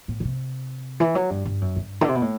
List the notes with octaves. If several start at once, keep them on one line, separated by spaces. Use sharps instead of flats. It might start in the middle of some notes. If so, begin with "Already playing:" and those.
A2
D3
C3
E3
F#3
G2
G2
F#2
G2
D3
C3
B2
A2